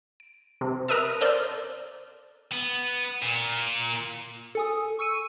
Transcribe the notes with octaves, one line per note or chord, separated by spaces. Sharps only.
D7
C3
A#4 B4 D#5 E5 A5
A4 A#4 C5 D5
B3
A#2
A4 G#5 D#6
C#6 E6 C#7 D#7